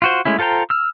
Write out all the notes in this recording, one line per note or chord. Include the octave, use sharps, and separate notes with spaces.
F4 F#4 C5
G#3 A3 C#4 E4
F4 A4 C5 G5 A#5
E6 F6